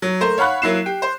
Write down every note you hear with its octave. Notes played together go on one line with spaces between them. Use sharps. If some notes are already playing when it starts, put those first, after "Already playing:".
F#3
A3 A#4 C5
C#5 F5 F#5 B5 F#6
F#3 A#3 E4 C7 E7
G4
C5